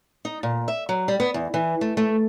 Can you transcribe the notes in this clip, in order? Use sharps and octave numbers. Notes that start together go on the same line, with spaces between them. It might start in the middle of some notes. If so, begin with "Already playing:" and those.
D#4
A#2
E5
F#3
G3
B3
E2
E3
A3
A3